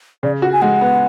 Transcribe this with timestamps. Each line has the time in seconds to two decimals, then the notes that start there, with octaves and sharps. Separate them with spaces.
0.23 C#3 D5
0.42 F#4 F#5
0.53 G#5
0.62 G#3 F#5
0.81 B3